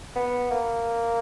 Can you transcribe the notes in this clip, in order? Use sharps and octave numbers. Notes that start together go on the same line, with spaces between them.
B3
A#3